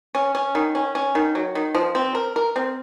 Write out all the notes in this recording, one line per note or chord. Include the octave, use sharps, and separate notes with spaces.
C#4
C#4
D#3
C#4
C#4
D#3
F#3
D#3
F3
C4
A#4
A#4
C4